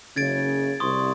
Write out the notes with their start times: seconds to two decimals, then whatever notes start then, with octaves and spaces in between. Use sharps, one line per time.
0.16 F#1 C#3 G#6 A6 D7
0.80 C2 C6 C#6 D#6